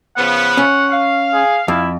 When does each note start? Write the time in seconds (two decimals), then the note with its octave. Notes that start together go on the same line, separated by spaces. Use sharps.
0.17 C#3 F3 B3 F#5
0.58 C#4
0.91 F5
1.33 G#4
1.68 F2 E4